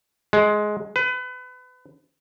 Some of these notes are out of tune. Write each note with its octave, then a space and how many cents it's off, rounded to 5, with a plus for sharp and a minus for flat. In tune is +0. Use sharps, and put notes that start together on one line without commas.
G#3 +15
B4 +30